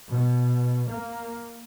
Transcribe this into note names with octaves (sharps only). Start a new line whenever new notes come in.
B2
A#3